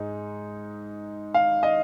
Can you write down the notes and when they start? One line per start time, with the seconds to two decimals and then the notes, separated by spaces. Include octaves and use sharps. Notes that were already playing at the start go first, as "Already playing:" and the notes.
Already playing: G#2 G#3 D#4
1.34 F5
1.63 D#5